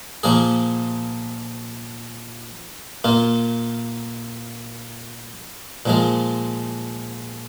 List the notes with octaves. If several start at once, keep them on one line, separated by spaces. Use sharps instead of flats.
A#2 F3 A#3 G#4
A#2 A#3 F4
A#2 F3 G#3